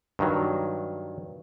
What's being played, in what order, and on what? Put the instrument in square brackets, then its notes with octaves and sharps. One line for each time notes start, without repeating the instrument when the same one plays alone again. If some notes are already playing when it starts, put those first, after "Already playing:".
[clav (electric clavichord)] G2 D#3 F#3